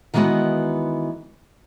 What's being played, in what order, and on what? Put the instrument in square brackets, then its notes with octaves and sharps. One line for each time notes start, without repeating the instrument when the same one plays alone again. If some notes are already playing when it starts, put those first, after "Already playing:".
[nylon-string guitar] D#3 E3 G#3 B3 F#4 D#5